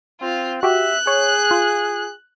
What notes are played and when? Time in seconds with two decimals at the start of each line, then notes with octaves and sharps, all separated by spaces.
0.21 C4 F4
0.63 F#4 G4 E5 F#6
1.07 G#4 C#5
1.51 F4